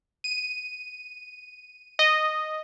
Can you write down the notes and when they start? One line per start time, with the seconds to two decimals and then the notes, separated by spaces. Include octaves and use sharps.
0.24 D#7
1.99 D#5